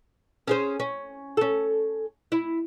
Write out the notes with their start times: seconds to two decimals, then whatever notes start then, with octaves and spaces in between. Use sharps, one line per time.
0.47 C#4 G#4 C5
0.80 C#4
1.37 C#4 A4
2.32 E4